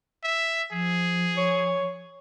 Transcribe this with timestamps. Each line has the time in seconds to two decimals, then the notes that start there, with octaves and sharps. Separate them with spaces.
0.23 E5
0.72 F3 G#4
1.37 C#5